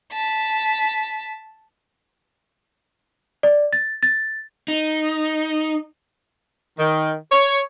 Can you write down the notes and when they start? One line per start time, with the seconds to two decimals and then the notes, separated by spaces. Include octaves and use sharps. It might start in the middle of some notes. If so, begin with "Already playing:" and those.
0.13 A5 B6
3.43 D5
3.73 A6
4.03 A6
4.68 D#4
6.79 D#3
7.32 C#5